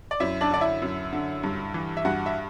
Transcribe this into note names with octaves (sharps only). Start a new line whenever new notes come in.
D5
F#2 E4 E5
D4 D5
D3 D5
E4 E5
F#2
D3
G2
E3
E5
G2 F#4 F#5
E5